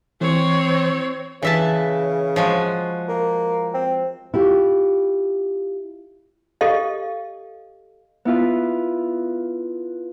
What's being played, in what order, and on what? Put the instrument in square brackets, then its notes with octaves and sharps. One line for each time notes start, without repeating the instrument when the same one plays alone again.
[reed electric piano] E3 [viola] C4 C#5
[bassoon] C#3 [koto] E3 E5 A5
[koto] F3 G#3 F#4
[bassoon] A#3
C4
[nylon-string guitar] E4 F4 G4
[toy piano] G4 A4 D#5 F5
[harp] B3 E4 F4 B4